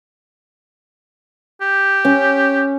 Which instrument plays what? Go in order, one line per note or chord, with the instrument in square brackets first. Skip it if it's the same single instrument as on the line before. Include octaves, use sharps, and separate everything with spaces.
[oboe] G4
[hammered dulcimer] C#4